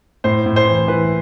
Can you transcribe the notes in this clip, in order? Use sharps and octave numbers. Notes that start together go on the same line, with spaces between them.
A2 C5
A2
C5
E3
E3 B4